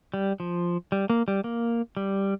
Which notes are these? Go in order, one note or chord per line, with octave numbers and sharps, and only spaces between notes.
G3
F3
G3
A#3
G3
A#3
G3